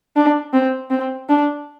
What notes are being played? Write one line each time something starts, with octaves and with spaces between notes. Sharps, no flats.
D4
C4
C4
D4